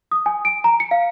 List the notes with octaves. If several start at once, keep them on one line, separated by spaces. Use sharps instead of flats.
D#6
G#5
D7
A#5
C#7
F5